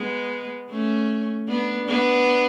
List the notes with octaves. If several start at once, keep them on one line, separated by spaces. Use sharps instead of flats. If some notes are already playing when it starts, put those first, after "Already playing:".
Already playing: G#3 B3
A3 C#4
B3 D4
B3 D4